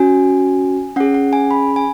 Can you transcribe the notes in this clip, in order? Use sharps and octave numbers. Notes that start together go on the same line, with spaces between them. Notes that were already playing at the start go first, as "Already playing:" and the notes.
Already playing: C#4 F#4 G#5
C#4 G#4 F#5
F#5
G#5
B5
G#5